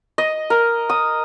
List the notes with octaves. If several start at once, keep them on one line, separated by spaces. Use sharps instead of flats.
D#5
A#4
D#6